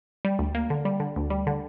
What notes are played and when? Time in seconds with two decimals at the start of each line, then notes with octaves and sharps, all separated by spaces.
0.25 G3
0.39 D2
0.55 A#3
0.70 D3
0.85 G3
1.00 D3
1.16 D2
1.30 G3
1.47 D3